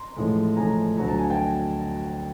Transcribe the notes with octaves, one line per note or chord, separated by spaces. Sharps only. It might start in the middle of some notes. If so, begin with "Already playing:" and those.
Already playing: A#5 C6
A1 A2 F3 G#3
A1 A2 F3 G#3 G#5 A#5
D2 D3 F#3 A#5
A5
G#5
G5 A5